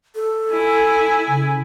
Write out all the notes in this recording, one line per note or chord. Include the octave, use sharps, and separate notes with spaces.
A4
E4 G#5
C#3